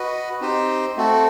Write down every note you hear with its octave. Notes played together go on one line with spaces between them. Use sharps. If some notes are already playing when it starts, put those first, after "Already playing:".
Already playing: F#4 B4 D#5
C4 D#4 G4 C5
A3 C4 F#4 A4